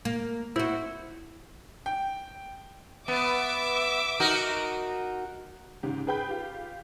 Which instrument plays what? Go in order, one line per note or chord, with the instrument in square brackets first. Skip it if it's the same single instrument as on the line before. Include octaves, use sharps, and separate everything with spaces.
[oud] A#3
[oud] C4 F#4 [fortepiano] E4
[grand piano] G5
[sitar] B3 [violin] E5 D6
[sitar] D#4 F#4 A#4
[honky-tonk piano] G#2 C#3 G4
G#4 B4 G5 B5 G6
F4 G4